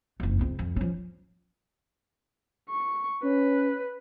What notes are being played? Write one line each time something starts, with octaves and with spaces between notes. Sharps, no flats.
F#1 F2
C#2 C4
F2
F3 C#4
C#6
C#4 B4